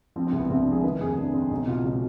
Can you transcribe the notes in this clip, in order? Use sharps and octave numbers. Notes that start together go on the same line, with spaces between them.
F3 C4
C4
C2
B3
C2 C4
D4
F3 G#4
D#3 B4
F1 G#4
F1 D4
F2 C4
B1 D#4
B2 F4
B2